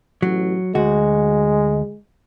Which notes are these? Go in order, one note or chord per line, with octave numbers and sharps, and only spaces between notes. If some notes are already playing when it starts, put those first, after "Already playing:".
A1 F#3
D2 G#3 F#4